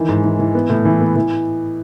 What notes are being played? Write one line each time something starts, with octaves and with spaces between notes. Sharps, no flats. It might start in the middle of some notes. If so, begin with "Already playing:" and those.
Already playing: D#3 E3
G#2
E3
E3
B3
A2
E3
B3
E3